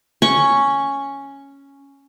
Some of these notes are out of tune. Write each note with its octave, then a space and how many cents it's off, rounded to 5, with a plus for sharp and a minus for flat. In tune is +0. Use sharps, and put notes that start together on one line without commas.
C#4 +0 C#6 +0